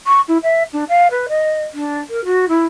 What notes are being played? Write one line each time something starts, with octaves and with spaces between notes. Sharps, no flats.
C#6
E4
E5
D4
F5
B4
D#5
D4
A#4
F#4
E4